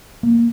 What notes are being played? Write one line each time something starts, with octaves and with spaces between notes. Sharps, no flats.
A#3